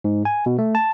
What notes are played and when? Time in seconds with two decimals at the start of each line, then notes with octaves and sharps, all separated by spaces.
0.04 G#2
0.25 G#5
0.46 B2
0.59 A3
0.75 A5